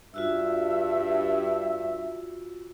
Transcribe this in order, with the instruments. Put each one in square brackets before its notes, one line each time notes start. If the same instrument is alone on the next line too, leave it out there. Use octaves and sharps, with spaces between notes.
[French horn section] G2 [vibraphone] F4 F#4 E6 [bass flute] E5